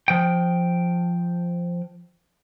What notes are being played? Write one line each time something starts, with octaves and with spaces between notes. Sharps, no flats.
F3 G5